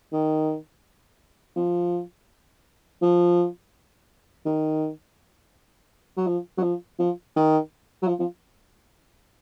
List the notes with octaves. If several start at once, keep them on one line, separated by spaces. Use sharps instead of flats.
D#3
F3
F3
D#3
F#3
F3
F#3
F3
F3
D#3
F#3
F3
F3